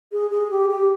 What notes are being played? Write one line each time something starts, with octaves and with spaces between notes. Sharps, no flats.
G#4
G#4
G4
G4